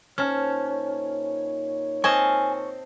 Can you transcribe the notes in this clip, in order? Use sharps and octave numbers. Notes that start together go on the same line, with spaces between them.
A#2 C#4 D#4 C5 C#5 A5 F6
C4 D#5 G#5 A5 C#6 F6